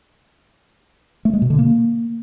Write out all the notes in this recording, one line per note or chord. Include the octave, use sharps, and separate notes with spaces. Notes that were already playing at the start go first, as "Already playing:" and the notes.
A3
G#3
B2
D3
A#3